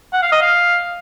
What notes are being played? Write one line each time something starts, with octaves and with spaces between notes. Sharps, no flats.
F#5
F5
D#5
F5